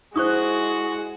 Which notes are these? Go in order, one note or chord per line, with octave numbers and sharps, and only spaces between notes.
G#3 E4 F#4 C5 C#6 D#6